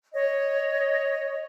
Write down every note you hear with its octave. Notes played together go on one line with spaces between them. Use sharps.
C#5 D#5